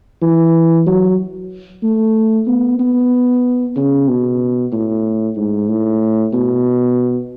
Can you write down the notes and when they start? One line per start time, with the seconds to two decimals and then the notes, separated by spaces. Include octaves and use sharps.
0.22 E3
0.86 F#3
1.83 A3
2.47 B3
2.79 B3
3.76 C#3
4.08 B2
4.72 A2
5.36 G#2
5.68 A2
6.33 B2